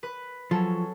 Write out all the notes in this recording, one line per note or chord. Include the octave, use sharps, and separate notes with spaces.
B4
F3 F#3 C#4 A4